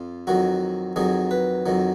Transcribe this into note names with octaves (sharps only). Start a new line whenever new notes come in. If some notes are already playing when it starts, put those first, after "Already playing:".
Already playing: F2 F4
F2 D#3 F#3 F#4
F2 D#3 F#3 G#4
B4
F2 D#3 F#3